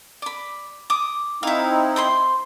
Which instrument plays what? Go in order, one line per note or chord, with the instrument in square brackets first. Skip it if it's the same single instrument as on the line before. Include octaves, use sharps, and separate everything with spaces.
[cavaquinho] D5 B5
D6 D#6
[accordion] C4 D#4 E4 [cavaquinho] E5 F5
[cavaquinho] C5 B5 C6